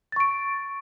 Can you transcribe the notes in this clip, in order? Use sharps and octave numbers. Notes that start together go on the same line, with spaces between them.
C#6 A6 D7